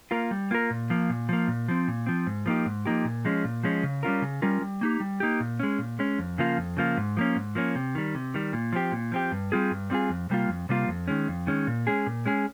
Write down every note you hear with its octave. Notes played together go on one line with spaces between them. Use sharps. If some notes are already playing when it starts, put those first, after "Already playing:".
A#3 F4 A#4
G3
A#3 F4 A#4
A#2
F3 A#3
A#2
F3 A#3
A#2
F3 C4
A#2
F3 C4
G#2
F3 A#3 D#4 G4
G#2
F3 A#3 D#4 G4
A#2
F3 G#3 C#4
A#2
F3 G#3 C#4
C#3
G3 C#4 F4 A#4
C#3
G3 C#4 F4 A#4
G3
A#3 D#4 G4
G3
A#3 D#4 G4
A#2
G#3 C#4
A#2
G#3 C#4
F2
C#3 F3 A#3 F4
F2
C#3 F3 A#3 F4
G#2
F3 A#3 C#4
G#2
F3 A#3 C#4
C3
D#3 G3
C3
D#3 G3
A#2
F3 C4 G4
A#2
F3 C4 G4
G2
G3 C4 F4 G#4
G2
G3 C4 F4 G#4
F2
C3 G3 A#3 F4
F2
C3 G3 A#3 F4
F2
D#3 G#3 C#4
F2
D#3 G#3 C#4
A#2
G#3 C#4 G#4
A#2
G#3 C#4 G#4